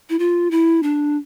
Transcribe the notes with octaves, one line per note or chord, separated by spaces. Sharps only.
E4
F4
E4
D4